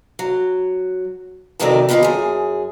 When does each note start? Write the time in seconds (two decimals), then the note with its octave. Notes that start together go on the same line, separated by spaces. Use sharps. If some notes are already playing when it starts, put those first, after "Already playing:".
0.19 F#3
1.60 F2 C3 D#3 F#3 A3 D5
1.89 B2 D#3 F3 E4 F4 G4
2.03 F#2 G#4